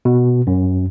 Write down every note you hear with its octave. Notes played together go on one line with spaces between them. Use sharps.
B2
F#2